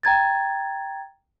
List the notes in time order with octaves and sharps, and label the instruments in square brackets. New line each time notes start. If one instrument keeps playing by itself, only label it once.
[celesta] G5 A#5 G#6 A6